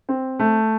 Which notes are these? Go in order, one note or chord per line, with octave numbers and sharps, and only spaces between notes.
C4
A3